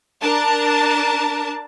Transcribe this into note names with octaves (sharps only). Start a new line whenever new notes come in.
D4 A#4 A5